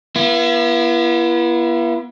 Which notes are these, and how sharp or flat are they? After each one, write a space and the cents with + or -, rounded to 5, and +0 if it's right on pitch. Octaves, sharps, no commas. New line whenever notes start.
B3 -35 E4 +40